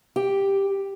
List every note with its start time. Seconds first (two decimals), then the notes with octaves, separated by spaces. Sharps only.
0.16 G4